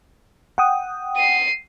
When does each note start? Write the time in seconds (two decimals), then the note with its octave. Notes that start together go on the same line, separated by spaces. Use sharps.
0.58 F#5 G5 D#6
1.17 C7 D#7